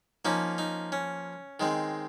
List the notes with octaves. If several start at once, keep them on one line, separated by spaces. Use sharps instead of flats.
F3 A#3 C#4 D#4
D#4
C#4
D#3 G#3 C4